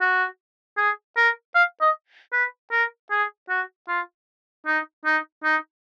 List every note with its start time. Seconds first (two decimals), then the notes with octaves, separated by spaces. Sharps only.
0.01 F#4
0.78 G#4
1.17 A#4
1.55 F5
1.82 D#5
2.33 B4
2.72 A#4
3.11 G#4
3.49 F#4
3.88 F4
4.67 D#4
5.06 D#4
5.44 D#4